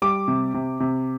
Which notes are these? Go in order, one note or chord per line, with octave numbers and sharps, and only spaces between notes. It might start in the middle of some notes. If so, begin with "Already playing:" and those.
G3 D6
C3
C3
C3